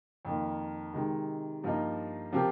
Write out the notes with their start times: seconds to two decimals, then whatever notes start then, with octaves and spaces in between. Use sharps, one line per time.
0.25 F2 D#3 A#3
0.93 C3 D#3 G#3
1.64 G2 F3 A#3 D#4
2.32 C3 F3 C4 G4 A#4